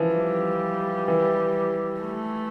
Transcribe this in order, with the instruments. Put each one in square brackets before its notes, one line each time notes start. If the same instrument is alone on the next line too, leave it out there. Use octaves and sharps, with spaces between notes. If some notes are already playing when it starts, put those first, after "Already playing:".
Already playing: [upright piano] E3 F3
[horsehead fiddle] G3
[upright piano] E3
[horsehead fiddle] A3